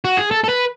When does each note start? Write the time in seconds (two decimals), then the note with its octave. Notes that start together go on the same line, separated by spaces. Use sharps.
0.05 F#4
0.17 G#4
0.31 A4
0.44 A4
0.49 B4